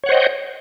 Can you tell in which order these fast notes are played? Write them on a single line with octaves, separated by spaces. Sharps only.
C#5 F#5 C5 D#5 G5